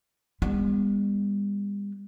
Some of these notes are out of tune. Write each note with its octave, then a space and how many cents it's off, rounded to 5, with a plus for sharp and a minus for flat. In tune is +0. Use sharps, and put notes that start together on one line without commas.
G3 +45 B3 +0